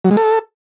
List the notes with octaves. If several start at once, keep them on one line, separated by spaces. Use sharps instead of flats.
F#3
G#3
A4